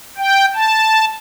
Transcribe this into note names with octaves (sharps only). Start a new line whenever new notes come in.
G5
A5